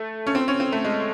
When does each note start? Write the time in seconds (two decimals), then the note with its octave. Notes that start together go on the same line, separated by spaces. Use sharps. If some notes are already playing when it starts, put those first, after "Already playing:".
Already playing: A3
0.27 C#4
0.35 C4
0.48 C#4
0.60 C4
0.72 A3
0.85 G#3